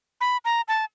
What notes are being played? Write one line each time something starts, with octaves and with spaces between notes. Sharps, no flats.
B5
A#5
A5